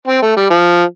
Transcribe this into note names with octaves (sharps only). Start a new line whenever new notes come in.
C4
A3
G3
F3